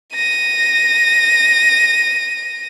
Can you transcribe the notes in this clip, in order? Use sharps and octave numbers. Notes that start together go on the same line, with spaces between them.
A#6 D#7